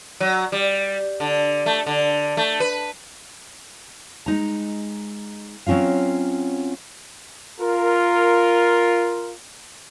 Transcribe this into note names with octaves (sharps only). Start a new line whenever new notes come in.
F#3
G3
D3
A3
D3
A3
B4
G#3 D#4 A#5
F#3 C4 C#4 F4 F5
F4 A#4